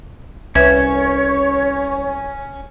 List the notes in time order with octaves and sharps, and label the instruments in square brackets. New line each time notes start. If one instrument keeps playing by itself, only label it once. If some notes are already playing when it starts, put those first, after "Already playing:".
[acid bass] C2 [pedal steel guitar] C#4 [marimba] B4 E5 G#6 [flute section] C#5 C#6